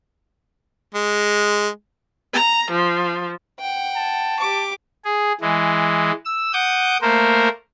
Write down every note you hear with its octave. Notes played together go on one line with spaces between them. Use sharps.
G#3
A#5
F3
F#5 G5
A5
G4 D6
G#4
E3 G#3
E6
F#5 D6 D#6 G6
A3 A#3 A#4 C5